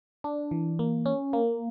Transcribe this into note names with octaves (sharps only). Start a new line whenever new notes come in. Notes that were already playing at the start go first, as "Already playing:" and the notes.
D4
E3
A#3
C#4
A#3